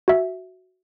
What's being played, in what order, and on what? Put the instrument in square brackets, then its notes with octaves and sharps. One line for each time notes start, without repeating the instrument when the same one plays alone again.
[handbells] F#4 E5